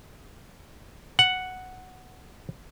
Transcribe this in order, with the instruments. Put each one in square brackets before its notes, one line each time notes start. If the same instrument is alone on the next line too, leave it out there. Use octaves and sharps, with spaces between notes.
[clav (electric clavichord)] F#5